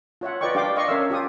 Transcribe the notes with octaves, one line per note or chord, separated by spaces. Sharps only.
F4 C#5 E5 F#5
F4 B4 D5 D#5 G5 C#6
D4 G4 F5 G5 D6
D5 D#5 F5 C6 C#6
C#4 A#4 C#5 E5 F5 E6
F4 G4 D#6